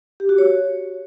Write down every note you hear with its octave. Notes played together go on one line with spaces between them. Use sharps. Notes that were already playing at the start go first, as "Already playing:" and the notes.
G4
F#4
C#5